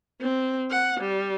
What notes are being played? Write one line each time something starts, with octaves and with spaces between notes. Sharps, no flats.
C4
F#5
G3